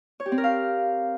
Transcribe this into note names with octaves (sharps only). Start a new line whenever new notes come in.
C#5
G4
C4
A#4
F5